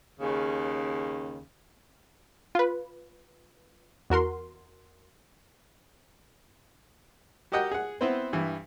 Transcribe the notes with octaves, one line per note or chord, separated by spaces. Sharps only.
D#2 C#3
F4 B4
E2 F#4 A#4 C6
F#4 G4 A#4 D#5 F#5 G5
G#4 F#5
B3 C4 E4 B4 C5
G2 E3